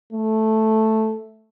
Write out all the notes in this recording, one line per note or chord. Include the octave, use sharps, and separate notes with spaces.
A3